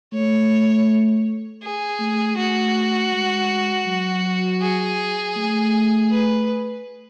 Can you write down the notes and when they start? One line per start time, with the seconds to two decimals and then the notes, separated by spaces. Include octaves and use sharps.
0.13 A3 C#5
1.63 G#4
2.00 A3
2.37 A3 F#4
3.13 G#3
3.86 F#3
4.62 G#4
5.36 A3
6.10 B4